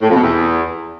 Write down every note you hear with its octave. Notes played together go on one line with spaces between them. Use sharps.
A2
F2
B2
E2